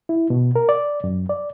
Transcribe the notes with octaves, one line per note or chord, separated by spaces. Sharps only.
E4
B2
A#4
D5
F#2
D5